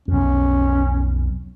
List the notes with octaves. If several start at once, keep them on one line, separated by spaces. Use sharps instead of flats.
B1 F2 C#4